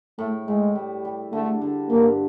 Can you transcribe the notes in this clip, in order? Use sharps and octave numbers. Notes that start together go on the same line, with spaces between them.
A2 A3
A2 G#3
G3
G3
D3 A3
D3
G2 A#3